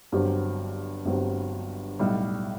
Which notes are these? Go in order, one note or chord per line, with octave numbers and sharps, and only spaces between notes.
G1 G2 F#3 C4 G4
G1 G2 F#3 C4 G4
B1 A2 G3